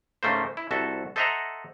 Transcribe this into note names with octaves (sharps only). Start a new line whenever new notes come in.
G#2 C#3 A3 A#3 C5
E4
C2 F#4 A4 E5
A4 C5 D#5 E5 F#5 A#5